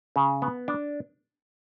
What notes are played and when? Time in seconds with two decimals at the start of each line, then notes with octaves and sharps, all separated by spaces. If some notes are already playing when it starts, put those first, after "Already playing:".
0.16 C#3
0.42 B3
0.68 D4